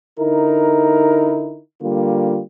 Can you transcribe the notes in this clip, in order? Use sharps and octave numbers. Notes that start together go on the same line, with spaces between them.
D3 D#4 E4 A#4
D3 G3 A#3 F4